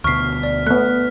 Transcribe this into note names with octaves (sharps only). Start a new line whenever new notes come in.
D2 B2 C#6 F6 B6 C7
D5
A3 B3 F#6